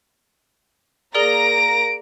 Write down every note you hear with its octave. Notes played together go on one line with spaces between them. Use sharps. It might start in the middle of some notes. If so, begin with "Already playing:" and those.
A#3 G#4 A#4 D5 A#5 A#6 D7